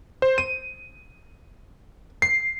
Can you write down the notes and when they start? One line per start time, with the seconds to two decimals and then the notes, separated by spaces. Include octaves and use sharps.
0.22 C5
0.38 D#7
2.22 C7